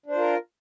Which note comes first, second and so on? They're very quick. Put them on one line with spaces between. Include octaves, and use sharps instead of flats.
D4 C5 F4 A#4